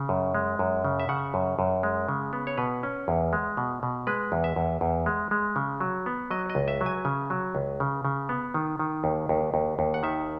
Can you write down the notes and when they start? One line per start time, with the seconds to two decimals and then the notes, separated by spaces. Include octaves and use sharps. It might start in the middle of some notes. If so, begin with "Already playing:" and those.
Already playing: C#3
0.09 F#2
0.35 G#3
0.59 F#2
0.84 C#3
1.00 E5
1.09 C#3 F#5
1.34 F#2
1.59 F#2
1.83 G#3
2.08 C#3
2.33 B3
2.47 C#5
2.58 B2 B4
2.83 C#4
3.08 E2
3.33 G#3
3.57 B2
3.83 B2
4.07 G#3 B4
4.32 E2
4.44 E5
4.56 E2
4.81 E2
5.06 G#3
5.31 G#3
5.56 C#3
5.81 F#3
6.06 B3
6.31 F#3 D#5
6.50 D#5
6.55 C#2
6.68 E5
6.81 F#3
6.86 G#5
7.05 C#3
7.30 F#3
7.55 C#2
7.80 C#3
8.05 C#3
8.29 B3
8.54 D#3
8.79 D#3
9.04 D#2
9.29 D#2
9.54 D#2
9.79 D#2
9.94 F#5
10.03 D#3 E5